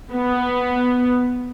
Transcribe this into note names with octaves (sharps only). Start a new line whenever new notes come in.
B3